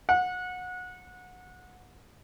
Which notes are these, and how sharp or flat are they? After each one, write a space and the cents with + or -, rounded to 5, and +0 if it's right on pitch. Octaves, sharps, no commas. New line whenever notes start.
F#5 -25